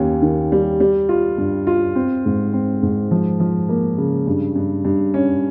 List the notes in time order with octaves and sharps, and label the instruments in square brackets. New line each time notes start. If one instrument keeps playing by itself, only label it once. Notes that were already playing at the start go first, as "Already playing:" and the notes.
Already playing: [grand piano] D#2 C#4
D#3
G3
G3
F4
G2
F4
C4
G#2
C4
G#2
F3
F3
A#3
C#3
G2
G2
G2
C#4